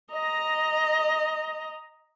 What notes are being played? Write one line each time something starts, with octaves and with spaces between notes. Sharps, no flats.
D#5 A#5